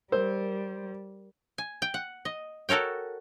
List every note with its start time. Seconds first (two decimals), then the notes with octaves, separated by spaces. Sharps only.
0.12 G3 A#4 C5
1.58 G#5
1.82 G5
1.94 F#5
2.25 D#5
2.69 F#4 A4 A#4 C#5 G5